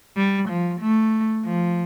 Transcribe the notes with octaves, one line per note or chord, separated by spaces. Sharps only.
G3
F3
A3
F3